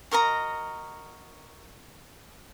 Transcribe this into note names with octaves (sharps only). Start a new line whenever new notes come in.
F#4 A#4 D#5 A#5